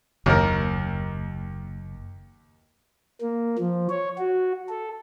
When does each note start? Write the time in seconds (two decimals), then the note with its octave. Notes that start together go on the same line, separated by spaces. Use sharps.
0.26 F#1 D#2 A#4
3.22 A#3
3.58 F3
3.90 C#5
4.18 F#4
4.69 A4